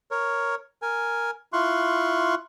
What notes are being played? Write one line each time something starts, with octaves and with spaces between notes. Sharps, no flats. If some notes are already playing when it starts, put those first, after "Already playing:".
A#4 C#5
A#4 G#5
E4 F4 C6 C#6 F#6